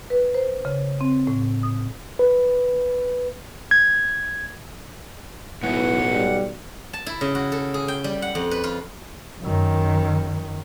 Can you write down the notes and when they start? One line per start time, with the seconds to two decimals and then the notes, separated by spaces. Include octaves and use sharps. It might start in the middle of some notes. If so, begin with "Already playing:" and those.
0.10 B4
0.34 C5
0.65 C#3
1.01 C4
1.27 A2
1.63 D#6
2.19 B4
3.71 G#6
5.63 B1 A2 E3 B3 F#5
6.11 G3
6.93 A5
7.06 E4
7.21 C#3
7.35 F#4
7.52 A4
7.74 G#4
7.88 G5
8.04 G3
8.22 F#5
8.35 F2
8.51 B4
8.64 F4
9.42 F#2 D#3